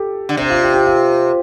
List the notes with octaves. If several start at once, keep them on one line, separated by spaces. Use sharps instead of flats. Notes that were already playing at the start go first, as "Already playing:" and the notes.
Already playing: G4 A4
D3
C3
F4
G4
G4
F4